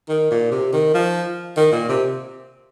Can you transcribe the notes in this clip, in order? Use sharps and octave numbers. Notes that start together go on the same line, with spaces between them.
D#3
A#2
C3
D#3
F3
D#3
A#2
C3